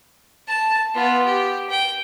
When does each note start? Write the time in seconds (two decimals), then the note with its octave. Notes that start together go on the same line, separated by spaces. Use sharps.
0.48 A5
0.94 B3 F4
1.26 G4
1.70 G5